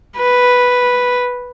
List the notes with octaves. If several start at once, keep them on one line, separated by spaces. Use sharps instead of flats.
B4